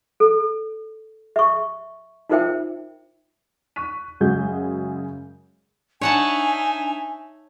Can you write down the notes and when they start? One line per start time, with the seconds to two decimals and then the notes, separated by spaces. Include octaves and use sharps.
0.20 A4
1.36 E5 C#6
2.30 D#4 F4 A#4 C5 E5 G5
3.76 C#6 F#6 B6 D#7
4.21 F#2 C#3 G#3 F#4 G#4 G6
6.01 D4 D#4 C#5 E5 F#5 G#5 A5